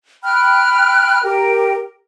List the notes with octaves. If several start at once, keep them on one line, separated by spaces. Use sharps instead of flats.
G5 B5 F6 F#6
G4 A#4 G5 A#5